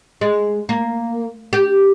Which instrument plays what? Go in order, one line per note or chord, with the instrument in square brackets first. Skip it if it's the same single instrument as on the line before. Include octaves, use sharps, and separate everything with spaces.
[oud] G#3
A#3
G4